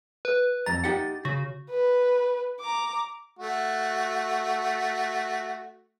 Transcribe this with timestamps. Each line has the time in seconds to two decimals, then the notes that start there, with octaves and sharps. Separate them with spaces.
0.25 B4
0.66 F2 A#5 A6
0.84 D#4 G4 F#5
1.25 C#3 F#4
1.70 B4
2.61 A#5 D6
3.39 A3 F#4